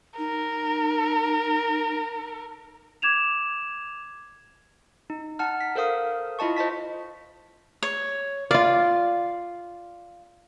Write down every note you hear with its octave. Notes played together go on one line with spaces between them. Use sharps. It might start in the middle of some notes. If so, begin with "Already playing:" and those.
D#4 A#4
D6 G#6 E7 F7
D#4
D#4 F#5 A5 F6
B6
A4 A#4 C5 F5 D#6
E4 F4 D#5 A5 C#6
C5 D#5 A5 B6
C#5
F4 D5 F5